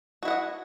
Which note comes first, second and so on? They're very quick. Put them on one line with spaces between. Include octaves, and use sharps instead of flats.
F#4 E4 F#5 D#5